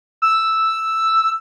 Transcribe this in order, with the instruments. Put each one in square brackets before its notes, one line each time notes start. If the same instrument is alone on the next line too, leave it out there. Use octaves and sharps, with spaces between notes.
[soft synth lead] E6